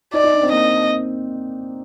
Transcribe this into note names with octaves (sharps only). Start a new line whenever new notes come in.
D#4 D5
D#4
D4
C4
A#3 D#5